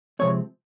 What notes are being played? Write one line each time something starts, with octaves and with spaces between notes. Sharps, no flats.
C3 F3 G#3 C4 C#5